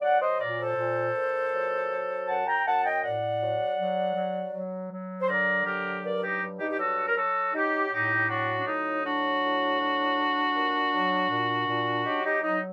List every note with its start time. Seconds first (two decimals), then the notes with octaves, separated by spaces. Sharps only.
0.02 F#3 D5 F#5
0.20 C5 D#5
0.39 A#2 A#4 D5
0.59 A4 C5
0.77 A#2
1.15 A#2
1.53 F#3
1.91 F#3
2.28 F#2 F#5 A5
2.46 G5 A#5
2.66 F#2 F#5 A5
2.84 D#5 G5
3.03 A2 D5 F#5
3.40 F#3
3.79 F#3
4.15 F#3
4.53 F#3
4.91 F#3
5.21 C5
5.28 D3 A#4 D5
5.66 F#3 G4 A#4
6.03 G2 A#4 D5
6.22 D#4 G4
6.41 G2
6.59 D#4 G4
6.70 G4
6.78 F#3 F#4 A4
7.08 A#4
7.16 F#3 F#4 A4
7.54 F#3 D#4 G4
7.91 A2 D#4 G4
8.29 F#3 D4 F#4
8.58 D4
8.66 A2 D#4
9.04 F#3 D4 F#4
9.43 A2
9.79 F#3
10.17 A2
10.56 A#2
10.93 F#3
11.30 A#2
11.68 A#2
12.05 F#3 D#4 G4
12.24 D#4 G4
12.42 F#3 D#4